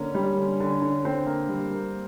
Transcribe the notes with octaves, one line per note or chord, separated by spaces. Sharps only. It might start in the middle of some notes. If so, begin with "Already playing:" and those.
Already playing: D3 A#3 C#4
G3
D3
D3
D3
D3 C4
A#3
G3
A#3